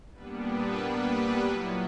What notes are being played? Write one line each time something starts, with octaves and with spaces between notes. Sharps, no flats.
A#2 G3 B3 D4 B4
B4
B4
A#2 F#3 B3 E4